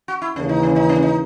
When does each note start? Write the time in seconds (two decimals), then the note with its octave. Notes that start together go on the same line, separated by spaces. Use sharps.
0.08 F#4
0.22 E4
0.36 D#2 C#3 E3 A#3 C#4
0.49 D#4
0.63 C#4
0.76 D#4
0.89 C#4
1.03 D#4